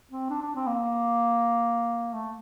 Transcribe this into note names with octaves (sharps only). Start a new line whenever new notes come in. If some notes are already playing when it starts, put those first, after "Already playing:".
C4
D4
D4
C4
A#3
A3